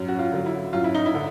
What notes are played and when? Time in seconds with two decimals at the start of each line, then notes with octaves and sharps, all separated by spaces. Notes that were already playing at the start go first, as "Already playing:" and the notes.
Already playing: F#2
0.08 F#4
0.19 F4
0.32 D3 F#3
0.46 E4
0.73 F#2 F4
0.84 E4
0.95 D#4
1.06 E4
1.14 D3